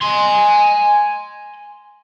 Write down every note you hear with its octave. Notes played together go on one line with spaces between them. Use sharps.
G#5 C6